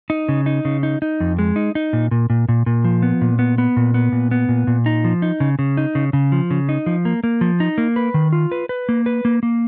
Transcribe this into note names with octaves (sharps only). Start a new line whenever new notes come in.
D#4
C#3
D#4
C#3
D#4
D#4
F2
G#3
D#4
D#4
A#2
A#2
A#2
A#2
A#2
F3
B3
A#2
B3
B3
A#2
B3
A#2
B3
A#2
A#2
D#4
F3
D#4
C#3
C#3
D#4
C#3
C#3
F3
C#3
D#4
F3
A#3
A#3
F3
D#4
A#3
B4
D#3
F4
B4
B4
A#3
B4
A#3
A#3